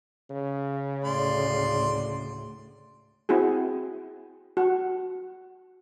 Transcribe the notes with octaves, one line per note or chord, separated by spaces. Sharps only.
C#3
D2 A2 D5 C6
C4 E4 F#4 G#4
F#4